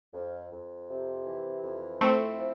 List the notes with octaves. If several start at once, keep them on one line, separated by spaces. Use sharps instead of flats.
F2
F2
C3
E3
F2
A3 C4 E4
F3